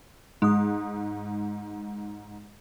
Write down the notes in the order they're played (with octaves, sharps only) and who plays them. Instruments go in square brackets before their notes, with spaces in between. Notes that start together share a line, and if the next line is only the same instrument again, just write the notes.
[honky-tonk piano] G#2 [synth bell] G#3 D#6